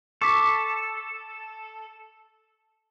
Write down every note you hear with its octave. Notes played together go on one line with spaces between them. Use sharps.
A4 C#6 D6 B6